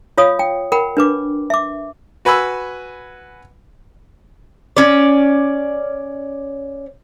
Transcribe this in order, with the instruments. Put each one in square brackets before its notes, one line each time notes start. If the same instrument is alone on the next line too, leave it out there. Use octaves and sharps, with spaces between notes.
[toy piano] F4 C#5 F5 D#6
G5
A#4 F#5 G5 B5
D4 B4 D6
E5 D6
[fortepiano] F#4 B4 G#5 B5 E6
[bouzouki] C#4 D5